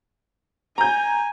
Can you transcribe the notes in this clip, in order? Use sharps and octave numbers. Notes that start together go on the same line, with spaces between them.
G#5 A#5 G6